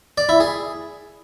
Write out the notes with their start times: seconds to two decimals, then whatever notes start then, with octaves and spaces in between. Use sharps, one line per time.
0.18 D5
0.29 E4
0.40 G#4